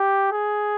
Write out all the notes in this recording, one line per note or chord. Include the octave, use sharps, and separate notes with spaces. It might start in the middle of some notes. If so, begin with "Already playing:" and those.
Already playing: G4
G#4